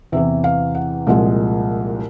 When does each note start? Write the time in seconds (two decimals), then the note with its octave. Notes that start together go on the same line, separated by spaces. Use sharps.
0.12 E2 C3 E3 E5
0.44 F5
0.75 F#5
1.07 C2 A#2 F3 G#3